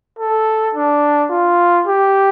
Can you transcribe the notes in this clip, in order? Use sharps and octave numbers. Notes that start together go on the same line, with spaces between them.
A4
D4
F4
G4